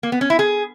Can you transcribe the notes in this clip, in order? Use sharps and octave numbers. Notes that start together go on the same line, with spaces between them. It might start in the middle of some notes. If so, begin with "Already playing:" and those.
A#3
B3
C#4
E4
G#4